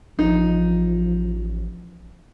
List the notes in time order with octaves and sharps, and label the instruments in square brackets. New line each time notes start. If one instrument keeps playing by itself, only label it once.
[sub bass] A1 [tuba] F3 [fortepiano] D#4